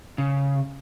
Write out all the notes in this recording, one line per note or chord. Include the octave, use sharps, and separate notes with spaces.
C#3